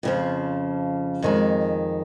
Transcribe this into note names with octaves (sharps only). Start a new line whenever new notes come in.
F2 C#3 F3
F2 D#3 G#3